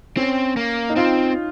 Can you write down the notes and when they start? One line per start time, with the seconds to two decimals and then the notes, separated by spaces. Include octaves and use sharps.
0.17 C4 C#4
0.57 A#3
0.90 D#4
0.96 C4 F4